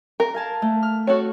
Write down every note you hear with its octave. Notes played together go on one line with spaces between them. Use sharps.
A#4
F5 G#5 A5
A3
F6
F#4 A4 C#5